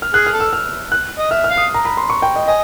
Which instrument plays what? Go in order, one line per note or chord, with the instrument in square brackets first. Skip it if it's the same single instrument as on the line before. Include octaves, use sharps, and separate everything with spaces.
[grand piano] F6
[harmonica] G#4 [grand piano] F#6
[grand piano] F6
[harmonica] A4
[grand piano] E6
F6
F#6
[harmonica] D#5
[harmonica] E5 [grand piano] F6
[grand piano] F6
[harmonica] F5
[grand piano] D#6
A#5
B5
C6
C#6
G5
D#5
[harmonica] D#5 [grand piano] G#5